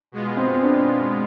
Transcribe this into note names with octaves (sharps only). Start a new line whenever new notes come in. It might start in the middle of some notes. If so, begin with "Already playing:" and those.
B2 G#3 B3 F4
C4
D4